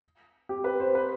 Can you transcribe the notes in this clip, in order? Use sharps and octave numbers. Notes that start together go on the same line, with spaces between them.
G4
B4
C5
B4